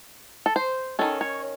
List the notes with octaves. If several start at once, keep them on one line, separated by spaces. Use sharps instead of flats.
A4
C5
D#3 G#3 C#4 A4
C#5